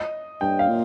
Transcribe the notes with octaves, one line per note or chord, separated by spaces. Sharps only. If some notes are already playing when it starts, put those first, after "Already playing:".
Already playing: D#5
G2 G5
F5
A#2